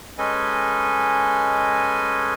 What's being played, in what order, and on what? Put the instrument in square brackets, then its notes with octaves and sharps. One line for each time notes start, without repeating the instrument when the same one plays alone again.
[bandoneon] G#3 C#4 A4 B4 D#5 G#5